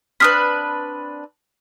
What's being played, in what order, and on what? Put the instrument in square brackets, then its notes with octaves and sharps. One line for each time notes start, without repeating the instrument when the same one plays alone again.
[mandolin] C4 D4 B4 [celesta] D#6 F6 B6